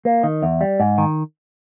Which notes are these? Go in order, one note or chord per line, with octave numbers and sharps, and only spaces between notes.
A#3
D#3
E2
G3
G#2
D#3